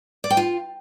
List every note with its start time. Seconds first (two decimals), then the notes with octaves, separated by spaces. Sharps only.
0.24 D5
0.30 G5
0.37 F4